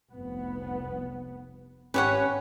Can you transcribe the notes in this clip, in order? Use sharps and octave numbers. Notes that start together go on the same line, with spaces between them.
F1 C2 B3
G#1 C#4 G4 B4 C#5 F#5